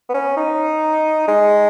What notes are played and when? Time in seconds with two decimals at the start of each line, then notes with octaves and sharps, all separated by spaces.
0.09 B3
0.14 C#4
0.37 D#4
1.28 G#3